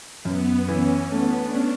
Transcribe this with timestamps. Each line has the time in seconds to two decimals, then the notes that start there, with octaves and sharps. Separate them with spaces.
0.25 F#2 B3
0.68 E3 C#4
1.12 A3 B3
1.41 D4
1.55 C#4